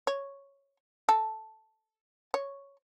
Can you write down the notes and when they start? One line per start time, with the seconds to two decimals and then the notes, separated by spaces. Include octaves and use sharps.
0.07 C#5
1.09 A4
2.34 C#5